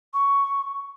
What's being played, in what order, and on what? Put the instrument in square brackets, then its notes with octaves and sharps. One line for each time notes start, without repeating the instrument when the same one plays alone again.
[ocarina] C#6